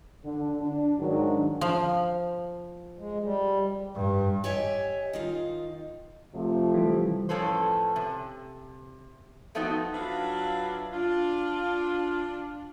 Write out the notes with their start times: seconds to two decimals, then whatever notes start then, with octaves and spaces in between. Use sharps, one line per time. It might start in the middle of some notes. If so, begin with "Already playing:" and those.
0.25 D3
0.61 D4
0.99 G#2 D#3 F#3 D4
1.61 F3
2.99 G#3
3.24 G3
3.95 G2
4.44 G4 C#5 D#5 E5 G#5
5.13 D#3 D#4 F4
6.35 C3 F3 A3
6.74 E3 G3
7.29 A2 F3 C#4 A4 B4 C5
7.96 C3
9.55 F3 A3 B3 C4 D#4 F#4
9.93 F#3 D4 F4 B4 E5 F5
10.93 D4 F4